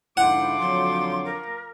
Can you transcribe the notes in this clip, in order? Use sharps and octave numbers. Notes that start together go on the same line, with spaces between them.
G#2 D3 F3 E4 C5 F#5 D6
F2 D3 F#3 C6
A#4